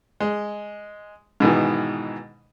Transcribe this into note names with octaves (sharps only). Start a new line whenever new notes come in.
G#3
G#2 B2 D#3 E3